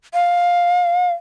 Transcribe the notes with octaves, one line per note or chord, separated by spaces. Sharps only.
F5